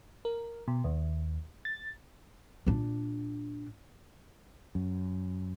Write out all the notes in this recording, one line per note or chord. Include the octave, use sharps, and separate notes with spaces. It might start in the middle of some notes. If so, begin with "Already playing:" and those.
A#4
B2
D#2
A6
A#2 D4
F#2